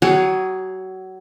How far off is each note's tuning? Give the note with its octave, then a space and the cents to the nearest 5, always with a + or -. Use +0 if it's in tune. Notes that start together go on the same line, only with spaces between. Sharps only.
F#3 +25 G#4 +0 C#5 -5